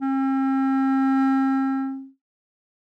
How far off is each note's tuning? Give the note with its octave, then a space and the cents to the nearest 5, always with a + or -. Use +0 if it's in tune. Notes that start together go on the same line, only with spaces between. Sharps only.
C4 +40